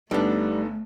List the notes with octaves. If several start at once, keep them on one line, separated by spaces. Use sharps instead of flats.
G1 D3 G3 A3 B3 D4 D#4